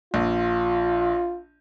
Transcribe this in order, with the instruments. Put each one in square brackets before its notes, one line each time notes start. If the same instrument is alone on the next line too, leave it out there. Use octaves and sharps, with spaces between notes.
[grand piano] A#1 [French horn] F4